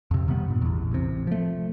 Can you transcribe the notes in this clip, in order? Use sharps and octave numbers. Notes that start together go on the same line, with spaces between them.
F2 C3
C3 D#3 G3 B3
G2 A#2
A1 E2
A1 C3
F3 A3